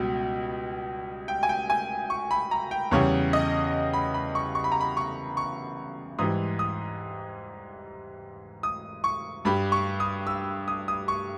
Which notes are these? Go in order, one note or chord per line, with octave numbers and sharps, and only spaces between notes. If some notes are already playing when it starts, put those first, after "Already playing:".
Already playing: C#2 B2 G3
G5
G#5
G5
G#5
C#6
B5
A#5
G5
E2 C#3 G3 C#5
D#5
B5
B5
C#6
C#6
B5
A#5
B5
C#6
C#6
G#2 E3 G3 D#6
D#6
D#6
C#6
G2 G3 B5
C#6
D#6
E6
D#6
D#6
C#6